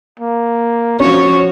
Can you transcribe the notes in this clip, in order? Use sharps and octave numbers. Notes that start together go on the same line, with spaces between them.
A#3
F3 C#4 F#4 C#5 C#6